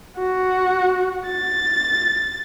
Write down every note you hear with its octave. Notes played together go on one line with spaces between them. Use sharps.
F#4
A6